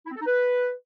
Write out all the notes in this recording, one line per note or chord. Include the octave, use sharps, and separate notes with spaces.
E4
C4
A4
D#4
B4